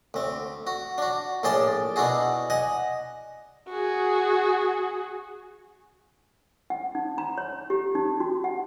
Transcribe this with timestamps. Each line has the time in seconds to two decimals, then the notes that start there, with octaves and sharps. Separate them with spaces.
0.14 D2 C4
0.67 F#4
0.98 D4 F#4
1.43 A#1 A2 G#4 D5 G5 A5
1.96 B2 D4 E4 F#4 G#4
2.50 D#5 F#5 G#5
3.69 F#4 G#4
6.70 F#5
6.95 D#4
7.18 A#5
7.38 C#5
7.70 G4
7.95 D#4
8.20 F#4
8.44 F#5